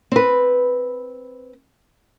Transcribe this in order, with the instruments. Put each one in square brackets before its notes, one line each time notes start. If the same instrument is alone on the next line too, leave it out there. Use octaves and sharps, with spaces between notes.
[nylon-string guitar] C4 B4